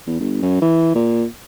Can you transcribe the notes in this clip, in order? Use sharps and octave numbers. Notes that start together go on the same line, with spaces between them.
E2
G1
F#2
E3
A#2